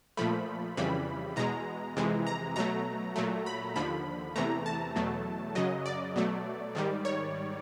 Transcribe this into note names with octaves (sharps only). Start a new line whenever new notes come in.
A#2 F3 A3 B5
F2 C#3 E3 G3 B5
E2 B2 G#3 A#5
F2 C3 E3 G#3
A#5
B2 F#3 A3 A#5
A#2 F#3 A3
B5
D#2 D3 F3 B5
E2 C3 E3 A3 A#5
A5
E2 B2 F#3 A3
F#2 C#3 F#3 D#5
D5
B2 F#3 A3
G#2 D#3 G3
C#5